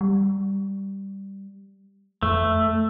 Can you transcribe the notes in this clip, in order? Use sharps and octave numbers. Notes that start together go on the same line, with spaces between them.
G3
F2 A3